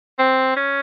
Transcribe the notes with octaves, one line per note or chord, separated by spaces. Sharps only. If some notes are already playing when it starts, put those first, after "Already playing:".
C4
C#4